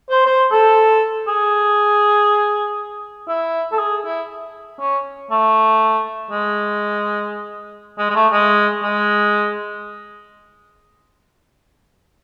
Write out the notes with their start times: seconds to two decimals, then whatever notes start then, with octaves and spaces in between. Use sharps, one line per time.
0.10 C5
0.26 C5
0.51 A4
1.27 G#4
3.28 E4
3.72 A4
3.79 G#4
4.05 E4
4.80 C#4
5.31 A3
6.31 G#3
7.98 G#3
8.10 G#3
8.15 A3
8.32 G#3
8.83 G#3